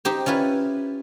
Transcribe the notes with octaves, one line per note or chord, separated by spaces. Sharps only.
D#4 G4 C5
C#4 E4 F4 B4